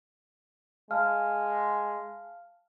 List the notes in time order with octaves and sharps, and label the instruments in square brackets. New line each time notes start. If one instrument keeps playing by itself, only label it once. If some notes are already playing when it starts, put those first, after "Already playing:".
[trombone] G#3 [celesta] F5 A5 F6